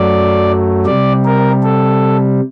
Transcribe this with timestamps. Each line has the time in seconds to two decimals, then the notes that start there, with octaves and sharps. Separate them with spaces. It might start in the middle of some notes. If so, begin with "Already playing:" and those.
Already playing: F#2 F#3 A3 D5
0.86 C3 G3 D5
1.25 A#4
1.63 A4